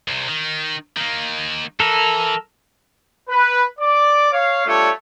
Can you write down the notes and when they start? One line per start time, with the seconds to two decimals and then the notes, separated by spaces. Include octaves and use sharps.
0.08 C2 C3
0.28 D#3
0.97 D#3 A#3
1.80 E3 A4 A#4
3.29 B4
3.79 D5 D6
4.32 C#5 F5
4.66 G3 A3 D4 F4 A4 C#5